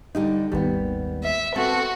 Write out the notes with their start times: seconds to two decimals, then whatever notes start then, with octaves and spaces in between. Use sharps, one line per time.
0.15 D3 G3 D#4
0.52 G#1 D#2 G3 B3
1.24 E5
1.56 C4 F#4 A4 B4 A5